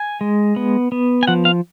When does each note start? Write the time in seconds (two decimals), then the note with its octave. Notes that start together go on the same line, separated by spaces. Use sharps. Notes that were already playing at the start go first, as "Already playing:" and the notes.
Already playing: G#5
0.21 G#3
0.56 B3
0.92 B3
1.23 G#5
1.27 F3 F#5
1.45 F5